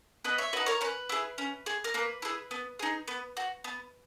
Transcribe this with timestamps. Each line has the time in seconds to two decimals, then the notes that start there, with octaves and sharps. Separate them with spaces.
0.24 B3 B4 D#5
0.38 C#5 E5
0.53 D#4 F#4 B4
0.66 A#4 C#5
0.81 C#4 B4
1.09 E4 G#4
1.38 C#4
1.66 G#4
1.84 A#4
1.94 A#3 B4
2.22 E4 G#4
2.51 B3
2.79 D#4 G#4
3.08 B3
3.37 F#4
3.64 B3